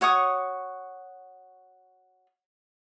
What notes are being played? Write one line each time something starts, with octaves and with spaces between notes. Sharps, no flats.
F#4 C#5 C#6 D#6